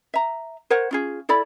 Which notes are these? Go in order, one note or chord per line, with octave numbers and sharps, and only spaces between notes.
E5 A#5
A#4 C5 C#5 F#5
C#4 F4 G#4
E4 A4 D5 B5